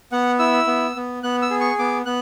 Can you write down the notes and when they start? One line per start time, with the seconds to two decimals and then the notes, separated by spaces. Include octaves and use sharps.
0.12 B3 F#5
0.39 E4 E6
0.67 B3
0.96 B3
1.23 B3 F#6
1.42 E6
1.51 G#4
1.60 C#6
1.79 B3 D6
2.06 B3 F#6